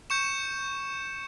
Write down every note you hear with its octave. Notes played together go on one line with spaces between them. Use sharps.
C#6 G6 C#7 E7